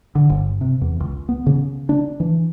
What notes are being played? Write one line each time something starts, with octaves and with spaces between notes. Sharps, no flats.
D3
G1
C3
E2
C#2
B3
C#3
D4
E3